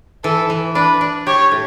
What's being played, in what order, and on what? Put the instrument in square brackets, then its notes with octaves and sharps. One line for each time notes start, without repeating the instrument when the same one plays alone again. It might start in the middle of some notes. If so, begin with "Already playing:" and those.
[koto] E3 [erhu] A4
[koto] E3
[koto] D4 [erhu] B4
[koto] D4
[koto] G4 [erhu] C#5
[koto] A2